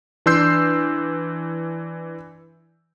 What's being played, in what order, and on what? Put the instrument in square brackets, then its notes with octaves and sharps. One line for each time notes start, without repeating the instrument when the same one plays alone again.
[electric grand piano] E3 D4 C6 E6 G6 C7